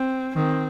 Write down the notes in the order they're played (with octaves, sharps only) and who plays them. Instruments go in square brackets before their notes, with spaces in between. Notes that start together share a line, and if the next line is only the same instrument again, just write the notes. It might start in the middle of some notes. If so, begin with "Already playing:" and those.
Already playing: [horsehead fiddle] C4
[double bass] D#3 [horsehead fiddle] C4